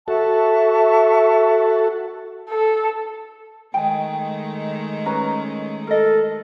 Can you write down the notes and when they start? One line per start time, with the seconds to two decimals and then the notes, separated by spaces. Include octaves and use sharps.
0.08 F#4 A4 E5 A5 C#6
2.49 A4
3.74 D#3 G#3 A3 G5 G#5
5.06 C#4 B4 A#5
5.87 A4 A#4 D#5